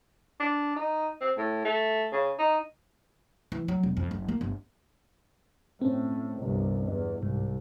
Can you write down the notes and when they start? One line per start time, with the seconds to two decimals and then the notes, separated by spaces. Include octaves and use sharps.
0.40 D4
0.77 D#4
1.21 C4
1.38 A2
1.65 A3
2.13 C#3
2.39 D#4
3.52 E3
3.68 F#3
3.83 E1
3.97 F2
4.11 F#1
4.28 A#3
4.41 G1
5.81 A2 C4 C#4
6.39 G1 C2
6.88 E2
7.23 C2 G#2